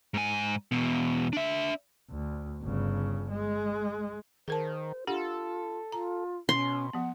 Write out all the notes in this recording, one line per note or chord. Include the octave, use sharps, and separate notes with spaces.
G#2 G#5
E2 B2
D4 E5
D2
G1 C#3
G#3
D#3 G#4 A#4 C5 A5
D4 F4 G4 A4 F#5
F4 A#5
B2 C#4 C6
F3 B3 F#5